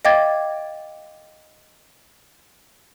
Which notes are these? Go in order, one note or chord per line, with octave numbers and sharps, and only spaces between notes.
D#5 F5 G5 D6 G#6 A6